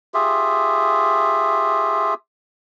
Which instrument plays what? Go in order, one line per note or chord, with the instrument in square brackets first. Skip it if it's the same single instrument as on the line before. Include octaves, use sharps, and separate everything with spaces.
[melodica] F4 G4 G#4 E5